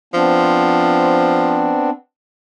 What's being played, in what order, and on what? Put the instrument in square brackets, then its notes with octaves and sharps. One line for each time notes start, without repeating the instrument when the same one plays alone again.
[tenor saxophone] F3 [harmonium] B3 C4 D4